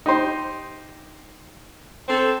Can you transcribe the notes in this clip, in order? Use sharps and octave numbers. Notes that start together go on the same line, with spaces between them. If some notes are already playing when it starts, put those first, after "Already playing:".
D#4 G4 C5
C4 A4